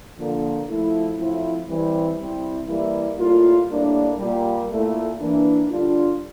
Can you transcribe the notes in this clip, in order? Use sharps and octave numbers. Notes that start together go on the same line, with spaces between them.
D3 F3 A#3
F3 A3 E4
A2 F3 C4 E4
E3 G3 C4
C3 G3 C4 E4
E3 G3 A#3 E4
A2 G3 A#3 F4
A2 G3 A#3 D4
A#2 G3 A#3
A#2 A3 E4
E3 A#3 D4
D3 G3 D4 F4